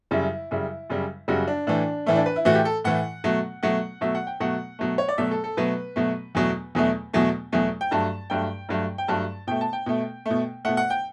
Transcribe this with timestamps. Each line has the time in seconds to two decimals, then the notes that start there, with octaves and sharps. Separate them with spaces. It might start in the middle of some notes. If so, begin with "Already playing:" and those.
0.11 F#2 C#3 G3 E4
0.51 F#2 C#3 G3 E4
0.90 F#2 C#3 G3
1.28 F#2 C#3 G3 F#4
1.48 D4
1.67 A2 E3 A3 D4
2.06 A2 E3 A3 E4
2.16 D4
2.26 B4
2.36 E4
2.45 A2 E3 A3 F#4
2.55 G4
2.65 A4
2.84 A2 E3 A3 F#5
3.24 B2 F#3 A3
3.63 B2 F#3 A3 F#5
4.01 B2 F#3 A3 E5
4.15 F#5
4.27 G5
4.40 B2 F#3 A3 F#5
4.79 B2 F#3 A3
4.98 C#5
5.08 D5
5.18 B2 F#3 A3 E5
5.31 A4
5.44 A4
5.57 B2 F#3 A3 B4
5.96 B2 F#3 A3
6.35 E2 B2 F#3 A3
6.75 E2 B2 F#3 A3
7.13 E2 B2 F#3 A3
7.52 E2 B2 F#3 A3
7.81 G5
7.91 G2 F#3 A3 A5
8.30 G2 F#3 A3 G5
8.69 G2 F#3 A3
8.98 G5
9.08 G2 F#3 A3 A5
9.47 B2 A3 G5
9.61 A5
9.73 G5
9.86 B2 A3
10.26 B2 A3
10.65 B2 A3 F#5
10.77 F#5
10.90 G5